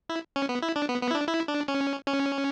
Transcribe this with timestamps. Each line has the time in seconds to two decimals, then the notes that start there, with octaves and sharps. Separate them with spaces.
0.09 E4
0.36 C#4
0.49 B3
0.62 E4
0.76 D4
0.89 B3
1.02 B3
1.11 E4
1.15 D4
1.28 E4
1.48 D4
1.68 C#4
2.07 C#4